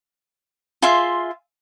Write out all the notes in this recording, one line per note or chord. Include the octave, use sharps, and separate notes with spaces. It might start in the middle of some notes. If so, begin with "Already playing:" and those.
F4 G#4 E5 C6